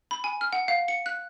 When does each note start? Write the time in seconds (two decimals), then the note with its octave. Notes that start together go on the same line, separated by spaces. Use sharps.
0.11 B5
0.24 G#5
0.41 F6
0.53 F#5
0.68 F5
0.88 C#7
1.06 F#6